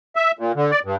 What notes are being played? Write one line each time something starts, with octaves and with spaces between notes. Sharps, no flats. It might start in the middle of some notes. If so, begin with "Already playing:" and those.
E5
A#2
D3
D5
G2